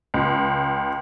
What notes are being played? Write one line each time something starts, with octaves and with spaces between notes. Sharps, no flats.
C#2